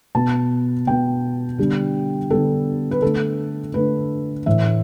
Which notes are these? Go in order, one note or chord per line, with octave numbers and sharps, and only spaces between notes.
B2 B3 A5
B2 B3 G5
D3 G3 B3
D3 G3 B3 A4
B4
D3 A3 A4
D3 A3 B4
A2 E3 A3 E5